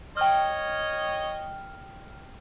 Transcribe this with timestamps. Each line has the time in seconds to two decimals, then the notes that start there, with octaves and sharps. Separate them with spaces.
0.17 C#5 D#5 G5 F6